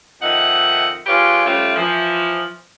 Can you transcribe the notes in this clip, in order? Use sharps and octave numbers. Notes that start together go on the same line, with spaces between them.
F2 D#3 D#4 E5 F#5
G#3 F4 G4 B4 C#5
G3 A3 C4 C#4 F4
E3 F3